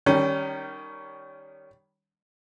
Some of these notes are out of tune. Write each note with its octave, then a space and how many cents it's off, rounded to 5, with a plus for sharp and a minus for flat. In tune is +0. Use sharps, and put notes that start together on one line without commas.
D#3 -15 G3 +0 C#4 +10